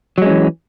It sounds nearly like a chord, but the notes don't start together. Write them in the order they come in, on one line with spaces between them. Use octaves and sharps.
F#3 G#3 C#4 E3